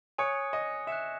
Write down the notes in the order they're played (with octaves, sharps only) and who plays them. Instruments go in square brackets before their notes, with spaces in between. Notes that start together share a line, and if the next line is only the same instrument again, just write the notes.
[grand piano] C#5 [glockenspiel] G#5 D#6 F#6 C#7
[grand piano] D#5
[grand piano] E5 [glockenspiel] F#6 C#7 E7